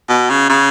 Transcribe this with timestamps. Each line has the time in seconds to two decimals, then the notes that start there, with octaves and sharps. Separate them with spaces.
0.09 B2
0.30 C#3
0.49 C#3